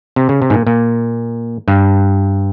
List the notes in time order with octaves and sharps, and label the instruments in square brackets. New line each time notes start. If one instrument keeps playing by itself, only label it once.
[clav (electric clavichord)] C3
C#3
C3
G#2
A#2
A#2
G2